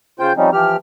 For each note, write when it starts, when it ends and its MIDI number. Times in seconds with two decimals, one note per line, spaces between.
0.19 0.33 49
0.19 0.33 65
0.19 0.33 72
0.19 0.33 79
0.19 0.33 91
0.37 0.50 53
0.37 0.50 55
0.37 0.50 60
0.37 0.50 61
0.37 0.50 63
0.53 0.77 52
0.53 0.77 53
0.53 0.77 67
0.53 0.77 89